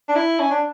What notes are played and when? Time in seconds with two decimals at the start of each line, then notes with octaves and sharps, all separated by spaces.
0.08 D4
0.15 E4
0.39 C#4
0.51 D4